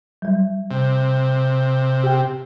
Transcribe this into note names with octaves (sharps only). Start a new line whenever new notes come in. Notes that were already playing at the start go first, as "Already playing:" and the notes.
F#3 G3
C3
G4 G5